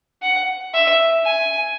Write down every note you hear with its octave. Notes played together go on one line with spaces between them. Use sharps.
F#5
E5
G#5